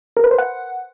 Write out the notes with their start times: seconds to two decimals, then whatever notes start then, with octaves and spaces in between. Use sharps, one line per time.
0.17 A#4
0.24 B4
0.31 C5
0.38 F#5